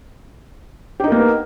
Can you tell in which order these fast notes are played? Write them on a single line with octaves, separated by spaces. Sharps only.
G4 D#4 A#4 A#3 B3